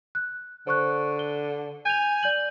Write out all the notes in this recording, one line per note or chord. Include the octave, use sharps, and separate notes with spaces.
F#6
D3 C5 C#6 F#6
G7
G#5 G6 F7
D5 G6 F#7